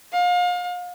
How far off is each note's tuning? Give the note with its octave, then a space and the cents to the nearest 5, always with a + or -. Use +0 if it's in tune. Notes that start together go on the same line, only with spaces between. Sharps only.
F5 +35